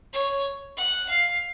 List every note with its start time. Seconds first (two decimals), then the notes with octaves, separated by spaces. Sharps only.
0.13 C#5
0.77 F#5
1.09 F5